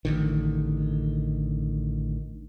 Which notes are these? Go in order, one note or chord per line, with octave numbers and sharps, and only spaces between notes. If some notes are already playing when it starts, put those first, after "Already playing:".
A1 D3 D#3